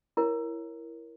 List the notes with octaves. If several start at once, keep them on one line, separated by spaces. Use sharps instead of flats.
E4 A#4 C#5